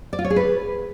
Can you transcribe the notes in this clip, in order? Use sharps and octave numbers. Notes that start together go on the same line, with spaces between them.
D5
F4
C#5
G#4
B4